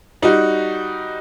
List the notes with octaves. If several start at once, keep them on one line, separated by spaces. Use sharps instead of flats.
G3 D#4 F#4